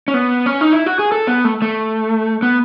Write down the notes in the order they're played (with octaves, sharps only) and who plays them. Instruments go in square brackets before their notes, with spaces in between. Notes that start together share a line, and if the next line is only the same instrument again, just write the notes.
[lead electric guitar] C#4
B3
C#4
D#4
E4
F#4
G#4
A4
B3
A3
A3
B3